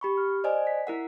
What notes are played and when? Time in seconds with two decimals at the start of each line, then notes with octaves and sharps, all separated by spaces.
0.01 G4 B5 C#6
0.17 F6
0.44 C5 D5 D#5 G#5
0.67 B6
0.87 E4 A#4 F#5